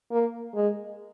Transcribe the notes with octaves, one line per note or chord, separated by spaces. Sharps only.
A#3
G#3